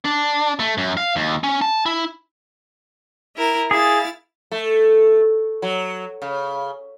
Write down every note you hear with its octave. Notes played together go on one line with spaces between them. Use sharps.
D4
A3
F#2
F5
D#2
C#4
A5
E4
E4 A#4 A#5
E4 G#4 F5 A6
A3
F#3
C#3